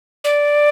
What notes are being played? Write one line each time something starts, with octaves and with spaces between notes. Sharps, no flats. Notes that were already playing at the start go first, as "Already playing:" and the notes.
D5